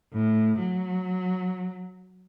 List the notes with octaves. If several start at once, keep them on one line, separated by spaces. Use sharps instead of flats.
A2
F#3